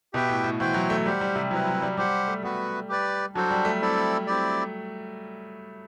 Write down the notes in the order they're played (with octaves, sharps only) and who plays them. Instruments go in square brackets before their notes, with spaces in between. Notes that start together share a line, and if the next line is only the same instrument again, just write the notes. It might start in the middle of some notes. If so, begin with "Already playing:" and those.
[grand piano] B2 [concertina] G4 B4 E5 G5
[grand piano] A2
A2
[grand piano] E3 [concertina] F#4 C5 G5
[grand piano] F#3
A3
[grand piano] G3 [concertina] G4 C5 F#5
[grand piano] G3
C3
[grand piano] F#3 [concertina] C4 E4 B4
[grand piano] F#3
G3
[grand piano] G3 [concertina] G4 C5 F#5
[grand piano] A3
[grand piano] G3 [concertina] B3 F#4 B4
[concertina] G4 B4 D5
[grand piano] F#3 [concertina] D4 F#4 A4 C5
[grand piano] G3
A3
[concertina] C4 E4 A4 D5
C4 E4 G4 D5